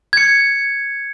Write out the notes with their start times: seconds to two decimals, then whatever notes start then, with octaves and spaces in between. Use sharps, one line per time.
0.13 G#6 C#7